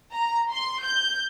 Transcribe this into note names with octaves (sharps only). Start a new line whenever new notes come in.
A#5
C6
G6